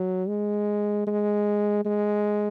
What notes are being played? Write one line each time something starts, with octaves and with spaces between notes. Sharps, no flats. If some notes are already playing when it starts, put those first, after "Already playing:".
Already playing: F#3
G#3
G#3
G#3